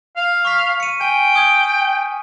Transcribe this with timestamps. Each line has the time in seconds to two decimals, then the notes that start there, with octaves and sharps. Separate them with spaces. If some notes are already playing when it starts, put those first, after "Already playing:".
0.17 F5
0.45 C#6 F6 B6
0.80 C#7 D#7
1.01 G5 G#5
1.35 D#6 G6 G#6